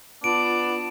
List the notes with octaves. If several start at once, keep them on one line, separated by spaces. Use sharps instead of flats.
B3 D4 F4 D7